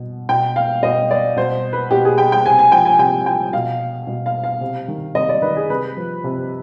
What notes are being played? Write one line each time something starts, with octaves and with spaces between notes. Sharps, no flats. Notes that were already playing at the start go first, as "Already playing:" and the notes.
Already playing: B2
B2 G5
F5
B2 D#5
D5
B2 C5
B4
B2 G4
G#4
G5
G5
C3 G#5
G#5
F3 G5
G#5
C3 G5
F3 G5
B2 F5
B2
F5
F5
C3
D#3
C3 D#5
D5
D#3 B4
G#4
C3 B4
F3
C3